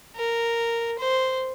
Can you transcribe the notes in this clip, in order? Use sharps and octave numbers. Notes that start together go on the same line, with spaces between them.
A#4
C5